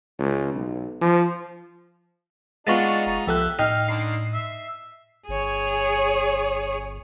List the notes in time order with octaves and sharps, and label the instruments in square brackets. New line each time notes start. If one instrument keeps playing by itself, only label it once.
[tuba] C#2
B1
F3
[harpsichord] G#3 B3 F4 [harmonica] D4 D#4 [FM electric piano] C#6 A6
[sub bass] F1 [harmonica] D#4
[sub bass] C2 [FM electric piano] F3 A4 F#6 [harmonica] G4 E5
[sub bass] A2 [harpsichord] D#4 [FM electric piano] D#5 G5 F6 [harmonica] F5
[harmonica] D3 D#3 [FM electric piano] C7
[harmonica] E5
[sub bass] G1 [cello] G#4 C#5